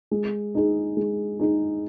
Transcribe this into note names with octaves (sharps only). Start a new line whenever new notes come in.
G#3
D#4 G#4
G#3
D#4 G#4